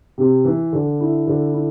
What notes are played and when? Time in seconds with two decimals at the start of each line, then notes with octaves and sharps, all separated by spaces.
0.18 C3
0.45 E3
0.73 D3
1.00 E4
1.27 D3
1.54 E4